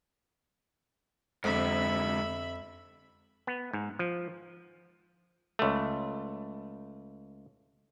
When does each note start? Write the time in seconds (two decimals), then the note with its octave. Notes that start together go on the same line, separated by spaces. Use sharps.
1.44 F2 G#2 D3 E5 B5
3.47 B3
3.73 G#2
3.99 F3
5.59 C#2 A3